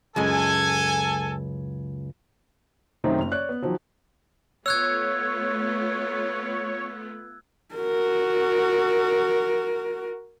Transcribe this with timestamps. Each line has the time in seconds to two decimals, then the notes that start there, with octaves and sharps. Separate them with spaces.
0.16 C#2 F#2 G#3 A4 G#5
3.04 F#2 C3 D#3 A3 C4 D#4
3.19 F#1 F7
3.32 C#5 D5 F#6
3.49 B3
3.62 D#3 F3 F#3
4.66 A3 B3 F4 C#5 E6 F#6 G#6
7.75 F#4 A#4